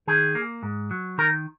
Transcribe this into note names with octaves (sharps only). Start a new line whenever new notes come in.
D#3 G#4
A#3
G#2
F#3
D#3 A#4